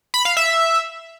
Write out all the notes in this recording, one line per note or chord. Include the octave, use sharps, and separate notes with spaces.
B5
F5
E5